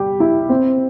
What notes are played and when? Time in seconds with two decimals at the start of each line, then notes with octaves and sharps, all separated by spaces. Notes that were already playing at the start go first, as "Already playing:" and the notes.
Already playing: G3 G4
0.20 E4
0.50 C4